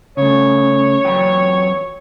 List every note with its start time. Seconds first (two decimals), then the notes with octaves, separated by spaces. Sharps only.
0.17 C#3 A3 C#5
1.04 E2 F#3 G5